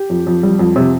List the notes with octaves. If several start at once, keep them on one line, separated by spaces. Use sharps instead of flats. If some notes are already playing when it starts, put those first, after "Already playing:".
Already playing: G4
F2
F2
G3
F2
C3